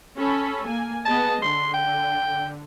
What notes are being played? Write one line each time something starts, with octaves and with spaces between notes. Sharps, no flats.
C#4 A4 B5
A#3 G#5
B3 G#4 D#5 A5
D3 C6
G5